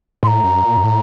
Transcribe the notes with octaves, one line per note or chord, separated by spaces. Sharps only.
A2 A#5 C6
F#2
A#2
F#2
A2